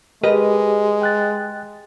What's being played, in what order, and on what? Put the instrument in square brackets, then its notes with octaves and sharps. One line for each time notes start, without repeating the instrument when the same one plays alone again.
[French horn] G#3 [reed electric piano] G4 G#4 [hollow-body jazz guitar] A#4 B4 D#5
[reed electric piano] G5 F#6 A6